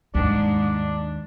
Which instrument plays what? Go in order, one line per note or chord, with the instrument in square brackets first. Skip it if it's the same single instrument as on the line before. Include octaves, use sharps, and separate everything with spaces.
[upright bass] D#2 [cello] G#2 [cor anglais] D4
[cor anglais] D4